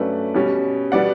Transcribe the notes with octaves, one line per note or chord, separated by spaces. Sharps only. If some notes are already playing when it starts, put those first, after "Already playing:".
Already playing: G2 F#3 A3 C#4 B4 D5
B2 G3 C#4
B2 G3 B3 D5 F#5